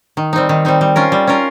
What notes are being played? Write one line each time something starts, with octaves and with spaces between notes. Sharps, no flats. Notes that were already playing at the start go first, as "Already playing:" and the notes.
D#3
G3 C4 D#4
D#3
G3 C4 D#4
G3
C#4 F4 A#4
G3
C#4 F4 A#4